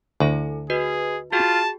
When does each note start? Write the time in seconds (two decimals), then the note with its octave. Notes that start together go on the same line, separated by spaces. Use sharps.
0.20 D2 E4 A4 G#5
0.70 F#4 G#4 B4 D#5
1.32 F4 F#4 G#4 G5 A5